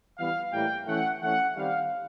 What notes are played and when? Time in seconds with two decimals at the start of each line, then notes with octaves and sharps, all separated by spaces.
0.17 E3 G3 B3 F5
0.52 A2 E3 G3 A#3 G5
0.86 E3 A3 C#4 F#5
1.21 E3 A3 C#4 F#5
1.56 D#3 G3 C4 F5